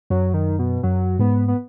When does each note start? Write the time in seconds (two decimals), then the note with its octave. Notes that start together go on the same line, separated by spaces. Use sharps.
0.10 F#2 F#3
0.34 D#3
0.59 B2
0.83 F#2 F#3
1.19 G#2 B3
1.48 B3